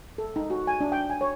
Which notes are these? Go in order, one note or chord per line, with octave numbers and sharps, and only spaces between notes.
A4
D#4
F#4
G#5
D4
G5
G#5
C#5